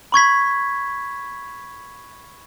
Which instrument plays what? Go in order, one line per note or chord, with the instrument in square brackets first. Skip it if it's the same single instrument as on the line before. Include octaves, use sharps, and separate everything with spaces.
[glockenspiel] B5 C#6 G#6 B6